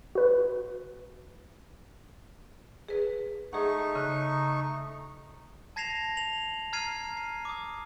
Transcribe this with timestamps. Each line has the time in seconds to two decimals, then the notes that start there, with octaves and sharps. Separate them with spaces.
0.15 F#4 B4
2.88 G#4 B4
3.53 A3 D#4 G#4 F#5 C#6
3.96 C#3 F#6
5.76 A5 G#6 A#6 C7 E7 F7
6.17 F7 F#7
6.73 A#5 F6 G#6 C7 D#7
7.17 C7
7.45 D6 D#6